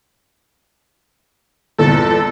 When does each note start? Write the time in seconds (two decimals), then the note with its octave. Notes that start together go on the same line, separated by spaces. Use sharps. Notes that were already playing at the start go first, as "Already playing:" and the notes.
1.78 G1 E2 A#2 A4